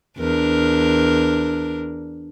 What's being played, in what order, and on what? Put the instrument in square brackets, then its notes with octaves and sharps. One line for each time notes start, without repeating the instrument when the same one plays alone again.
[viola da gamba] E2 D4 A#4